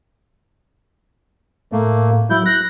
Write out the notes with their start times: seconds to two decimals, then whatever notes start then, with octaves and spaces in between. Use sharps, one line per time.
1.72 A2 A3 A#3
2.30 F#3 E4 G6
2.46 F#6 A#6